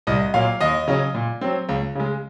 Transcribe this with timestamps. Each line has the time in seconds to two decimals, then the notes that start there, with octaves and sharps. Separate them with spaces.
0.07 C2 D#5
0.34 A#2 F#3 A#3 F5
0.60 D#2 D#5
0.88 C#3 F#3 C#4
1.14 A#2
1.41 F#3 C4
1.69 C#2
1.95 C#3 G#3